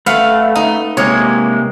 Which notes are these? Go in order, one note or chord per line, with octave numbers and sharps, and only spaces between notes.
A3 B4 F5 F#5
D#4
C3 G#3 A#3 C#5